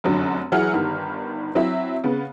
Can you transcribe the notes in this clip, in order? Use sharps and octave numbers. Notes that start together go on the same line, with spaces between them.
F1 F#2 D3 F#3
E3 F#3 E4 G#4 F#5 F6
G1 D#3 G3
F#3 C4 E4 E5
C#3 B3